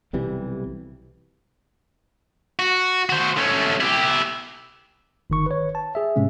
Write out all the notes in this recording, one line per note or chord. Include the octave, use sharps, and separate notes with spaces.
B1 C3 E3 G3
F#4
F#4 C5
A3 C#4
E4 G4
G1 D#3 C#6
B4 C#5
A5
G#4 E5
G#2 C3 G#3 C#4